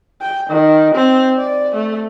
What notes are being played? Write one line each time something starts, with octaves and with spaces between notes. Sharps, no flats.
G5
D#3
C4
D5
A3